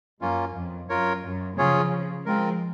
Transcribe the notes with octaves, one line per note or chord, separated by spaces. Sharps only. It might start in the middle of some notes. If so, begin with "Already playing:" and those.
F#2 A#3 C#4 F4
F2
F#2 F4 A#4 C#5
F#2
C#3 F3 C#4 F4 G#4 C#5
F3 G#3 C4 F4 A#4